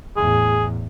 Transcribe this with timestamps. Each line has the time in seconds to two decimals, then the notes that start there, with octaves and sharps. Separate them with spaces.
0.17 E2 A2 G#4